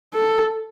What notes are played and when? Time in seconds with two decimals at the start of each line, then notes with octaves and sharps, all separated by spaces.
0.14 A4